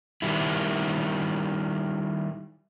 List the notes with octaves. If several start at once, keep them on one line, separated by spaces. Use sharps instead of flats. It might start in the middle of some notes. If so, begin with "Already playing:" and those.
D#3 G3 E4